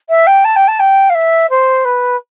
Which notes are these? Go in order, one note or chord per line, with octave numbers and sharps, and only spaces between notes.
E5
G5
A5
G5
A5
G5
F5
E5
C5
B4